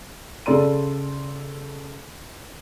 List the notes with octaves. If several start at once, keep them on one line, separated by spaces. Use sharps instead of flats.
C#3 A4 D5 C6 D#7